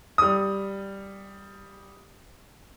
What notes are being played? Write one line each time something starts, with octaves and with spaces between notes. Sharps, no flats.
G3 D#6